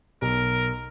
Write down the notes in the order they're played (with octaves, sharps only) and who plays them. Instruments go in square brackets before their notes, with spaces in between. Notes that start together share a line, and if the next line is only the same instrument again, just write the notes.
[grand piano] B1 [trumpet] A#4